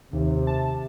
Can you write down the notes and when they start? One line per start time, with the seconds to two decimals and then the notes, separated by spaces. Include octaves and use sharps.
0.13 D#2 C3
0.47 A5